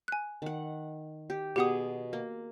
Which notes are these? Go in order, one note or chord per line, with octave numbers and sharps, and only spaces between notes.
G#5 F#6
D#3 F#5
G4
B2 G4 G#4 F#5 D#6
A#3